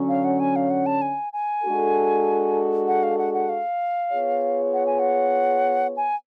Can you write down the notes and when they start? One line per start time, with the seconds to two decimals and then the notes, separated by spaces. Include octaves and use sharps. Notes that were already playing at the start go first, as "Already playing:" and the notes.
Already playing: D3 F#3 C#4
0.09 F5
0.24 F#5
0.40 G#5
0.56 F5
0.70 F#5
0.86 A5
1.02 G#5
1.33 G#5
1.63 G#3 D4 F#4 A4
2.88 F#5
3.03 F5
3.18 F#5
3.34 F#5
3.49 F5
4.12 B3 F4 G#4 C#5
4.73 F#5
4.86 G#5
4.99 F#5
5.97 G#5